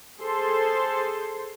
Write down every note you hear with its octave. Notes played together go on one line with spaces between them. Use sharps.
G#4 A4 C5 C6